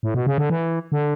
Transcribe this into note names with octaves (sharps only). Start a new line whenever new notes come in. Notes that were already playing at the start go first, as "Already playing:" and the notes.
A2
B2
C#3
D3
E3
D3